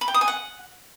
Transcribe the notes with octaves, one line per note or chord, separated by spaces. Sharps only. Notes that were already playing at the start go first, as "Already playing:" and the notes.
B5
G5
D#6
G#5
F#5